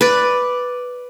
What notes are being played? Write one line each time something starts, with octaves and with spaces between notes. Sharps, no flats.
B4 D5